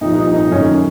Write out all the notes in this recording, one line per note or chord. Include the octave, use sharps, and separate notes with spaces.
C2 A#2 F3 D#4
D#4
D#4
F#2 D#3 C#4